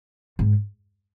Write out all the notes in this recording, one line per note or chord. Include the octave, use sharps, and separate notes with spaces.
G#2